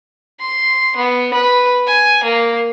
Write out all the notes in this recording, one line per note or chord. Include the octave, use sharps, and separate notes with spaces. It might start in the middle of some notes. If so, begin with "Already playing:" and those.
C6
B3
B4
G#5
A#3